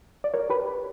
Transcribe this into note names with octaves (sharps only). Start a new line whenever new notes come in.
D5
A#4 C#5
G4 B4